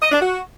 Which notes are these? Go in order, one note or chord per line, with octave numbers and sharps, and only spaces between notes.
D#5
D4
F#4